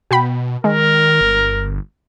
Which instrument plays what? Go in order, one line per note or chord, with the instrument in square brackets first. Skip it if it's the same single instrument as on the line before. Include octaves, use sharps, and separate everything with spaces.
[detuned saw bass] B2 [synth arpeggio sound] F#4 G5 B5
[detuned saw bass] D#3 [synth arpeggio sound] G#3 [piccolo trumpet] A#4
[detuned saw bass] G1